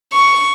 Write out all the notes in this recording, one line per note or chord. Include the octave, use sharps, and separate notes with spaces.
C#6